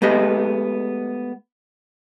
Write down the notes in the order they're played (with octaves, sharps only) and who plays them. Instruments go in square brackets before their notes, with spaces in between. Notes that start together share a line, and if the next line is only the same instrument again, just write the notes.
[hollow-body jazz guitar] G#3 A3 B3 G4 D#5